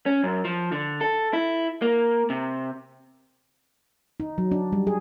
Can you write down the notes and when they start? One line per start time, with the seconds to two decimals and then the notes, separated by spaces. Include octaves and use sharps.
0.06 C#4
0.24 F#2
0.45 F3
0.72 D3
1.01 A4
1.33 E4
1.82 A#3
2.30 C3
4.20 D#4
4.38 F#3
4.52 D4
4.72 G3
4.87 G#4